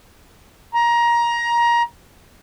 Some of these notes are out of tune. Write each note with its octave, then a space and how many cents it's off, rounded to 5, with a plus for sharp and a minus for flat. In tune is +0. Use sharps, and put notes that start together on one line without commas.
A#5 +20